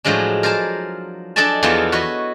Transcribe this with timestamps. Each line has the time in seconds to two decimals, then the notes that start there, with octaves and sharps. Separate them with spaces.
0.05 A2 F3 F#3 G#3 D4
0.43 A#4 C5 D5 G#5 A5
1.36 D4 A4 D5 D#5 G#5 A5
1.63 E2 E3 F3 B3 F4 A4
1.92 F#4 B4 C#5 D#5